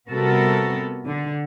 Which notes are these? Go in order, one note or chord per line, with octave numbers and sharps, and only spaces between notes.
C3 G3 B3 F#4 A4 A#4
D3